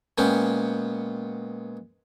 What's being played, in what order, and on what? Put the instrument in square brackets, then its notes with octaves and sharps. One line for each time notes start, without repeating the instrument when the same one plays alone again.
[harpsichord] A#2 G#3 B3 C#4 G5